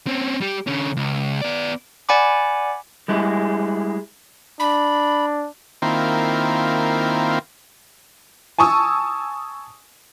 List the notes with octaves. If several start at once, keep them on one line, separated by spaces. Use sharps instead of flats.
C4 C#4
G3 G4
D3 C#4
C#2
B3 D5
D5 F#5 G#5 B5 D6
G3 G#3 E4 G#4
D4 B5
D#3 A#3 C4 E4 F4
G#5 A5 C#6 D#6 E6